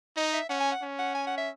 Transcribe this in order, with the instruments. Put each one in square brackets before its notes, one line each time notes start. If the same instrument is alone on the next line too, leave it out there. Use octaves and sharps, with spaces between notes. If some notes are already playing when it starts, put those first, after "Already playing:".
[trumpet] D#4 [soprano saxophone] D#5
[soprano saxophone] E5
[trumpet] C#4 [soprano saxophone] F#5
[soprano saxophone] G#5
F#5
[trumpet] C#4
[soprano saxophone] F#5
G#5
F#5
E5